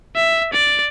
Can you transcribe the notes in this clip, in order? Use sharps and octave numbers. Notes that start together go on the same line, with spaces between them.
E5
D5